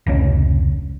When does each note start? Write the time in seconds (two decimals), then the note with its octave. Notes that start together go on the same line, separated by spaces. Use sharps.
0.06 F1 C#2 C#4